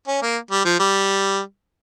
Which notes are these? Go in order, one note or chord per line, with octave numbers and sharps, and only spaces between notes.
C#4
A#3
G3
F3
G3